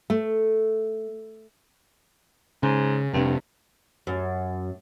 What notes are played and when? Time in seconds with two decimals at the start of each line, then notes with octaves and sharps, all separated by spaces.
0.10 A3
2.63 G#2 C#3
3.14 F1 G2 C3
4.07 F#2